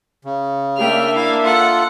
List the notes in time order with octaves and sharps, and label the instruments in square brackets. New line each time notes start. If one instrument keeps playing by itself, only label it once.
[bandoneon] C#3
[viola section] A#3 D4 E5 [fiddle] G5 F6
[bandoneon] E4 [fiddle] F5
[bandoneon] F4 A4 [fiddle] F#5